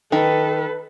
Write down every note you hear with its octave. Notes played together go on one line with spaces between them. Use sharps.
D#3 A4 B4